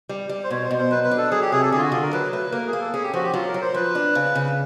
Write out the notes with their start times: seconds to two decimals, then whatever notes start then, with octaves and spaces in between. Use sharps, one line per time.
0.09 G3
0.29 G3
0.44 C5
0.50 B2 C#5
0.64 C5
0.71 B2
0.78 C5
0.91 F#3 B4
1.04 B4
1.11 D4
1.17 A4
1.31 F#3 G#4
1.42 G4
1.52 C3 G#4
1.62 A4
1.72 D3 G#4
1.78 F4
1.81 F#4
1.92 D3 F4
2.02 A#4
2.13 F#3 B4
2.32 A3 B4
2.52 A#3 A#4
2.67 G#4
2.73 A#3
2.80 A4
2.94 C#4 G#4
3.03 G4
3.13 F3 F#4
3.23 G4
3.34 F#3 F4
3.48 A#4
3.54 F#3
3.62 C5
3.74 F3 B4
3.95 D4
4.15 C#3
4.35 C#3